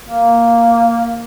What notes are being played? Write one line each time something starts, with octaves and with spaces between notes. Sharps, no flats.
A#3